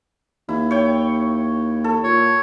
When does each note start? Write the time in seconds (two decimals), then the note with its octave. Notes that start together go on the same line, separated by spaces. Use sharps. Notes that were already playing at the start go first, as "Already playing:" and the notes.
0.49 D#2 E4
0.71 C#5 G5
1.84 A4
2.04 A#2 C#5